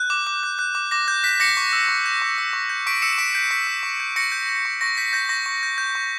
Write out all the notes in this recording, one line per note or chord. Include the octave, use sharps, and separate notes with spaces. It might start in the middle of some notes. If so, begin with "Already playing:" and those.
Already playing: F#6 G6
D6
D6
F#6
F#6
D6
D6 A#6
F#6 G6
F#6 B6
D6 A#6 C#7
C#6
E6
C#6
G6
C#6
E6
C#6
G6
C#6 B6 D7
E6 C#7 E7
E7
C#6 B6 D7
G6 B6 D7
C#6 B6
E6
C#6
G6
C#6 A#6 C#7
G6
G6
C#6
C#6 A#6
G6 B6
G6 A#6
C#6 A#6
C#6
G6
G6
C#6